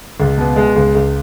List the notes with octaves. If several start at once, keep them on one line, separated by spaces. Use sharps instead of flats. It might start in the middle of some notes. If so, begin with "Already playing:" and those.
C#2
B2
G#3
C#2
C#2